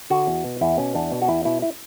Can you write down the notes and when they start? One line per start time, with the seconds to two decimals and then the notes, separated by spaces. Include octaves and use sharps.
0.10 D3 F#4
0.27 E2
0.44 B2
0.61 E2 E4
0.78 B2 C#4
0.95 E2 D4
1.12 B2
1.22 F#4
1.28 E2 E4
1.45 B2 E4
1.62 E4